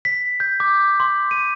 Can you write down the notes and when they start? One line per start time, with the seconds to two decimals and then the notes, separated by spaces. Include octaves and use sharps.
0.05 B6
0.40 G6
0.60 D6
1.00 C6
1.31 D#7